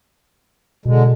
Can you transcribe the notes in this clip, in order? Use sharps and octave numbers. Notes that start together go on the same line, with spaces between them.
B2 D3 G#3